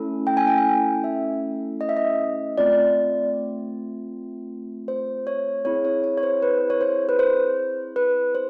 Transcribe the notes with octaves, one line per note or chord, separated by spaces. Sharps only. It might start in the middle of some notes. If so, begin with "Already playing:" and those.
Already playing: A3 C#4 E4 A4
G5
G#5
G5
G#5
G5
E5
D#5
E5
D#5
A3 C4 F4 D5
C5
C#5
C4 E4 G#4 C#5
C#5
C#5
C#5
C5
B4
C#5
C5
B4
C5
B4
C5